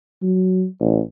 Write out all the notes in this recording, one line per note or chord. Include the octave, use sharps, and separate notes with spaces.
F#3
A1